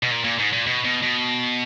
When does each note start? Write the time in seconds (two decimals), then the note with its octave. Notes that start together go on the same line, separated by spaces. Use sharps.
0.03 B2
0.11 A#2
0.24 A#2
0.39 G#2
0.53 A#2
0.66 B2
0.85 B2
1.02 B2